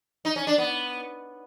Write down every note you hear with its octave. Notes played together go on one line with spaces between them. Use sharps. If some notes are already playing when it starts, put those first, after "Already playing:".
D#4
C#4
D4
B3